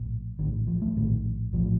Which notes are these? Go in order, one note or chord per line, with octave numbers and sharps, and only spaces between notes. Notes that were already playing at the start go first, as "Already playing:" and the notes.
Already playing: A#1 A2
A#1 A2 D#3
F3
A3
A#1 A2 D#3
A#1 A2 F3